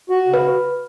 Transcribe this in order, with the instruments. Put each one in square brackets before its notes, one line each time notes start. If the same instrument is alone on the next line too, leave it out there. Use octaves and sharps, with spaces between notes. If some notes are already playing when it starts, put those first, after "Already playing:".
[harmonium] F#4
C#3
[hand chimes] B4